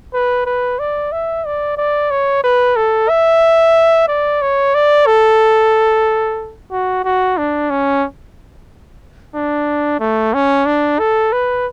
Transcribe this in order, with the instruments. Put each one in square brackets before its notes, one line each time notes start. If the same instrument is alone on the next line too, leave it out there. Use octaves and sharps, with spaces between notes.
[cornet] B4
B4
D5
E5
D5
D5
C#5
B4
A4
E5
D5
C#5
D5
A4
F#4
F#4
D4
C#4
D4
A3
C#4
D4
A4
B4